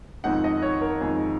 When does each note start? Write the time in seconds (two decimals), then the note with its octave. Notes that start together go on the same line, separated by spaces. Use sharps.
0.24 F2 D#3 G#3 D#4 F#5
0.44 D#5
0.62 C#5
0.81 A#4
1.01 F2 D#3 G#3 D#4 G#4